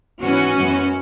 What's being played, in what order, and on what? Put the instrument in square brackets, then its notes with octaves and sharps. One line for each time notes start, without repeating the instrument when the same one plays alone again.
[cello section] G#2 E3 B3 C#4 F#4
F#2 E3 G#3 B3